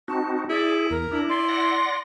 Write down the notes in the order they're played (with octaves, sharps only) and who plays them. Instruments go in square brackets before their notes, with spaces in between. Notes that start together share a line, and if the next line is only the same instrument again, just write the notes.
[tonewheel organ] C4 D#4 F#4 [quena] A5
[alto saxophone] E4 [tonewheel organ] G#4 [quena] D5
[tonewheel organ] E2 [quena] A#4
[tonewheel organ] D4 [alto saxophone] E4
[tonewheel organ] D5 [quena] C6
[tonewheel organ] D5 F#5 A#6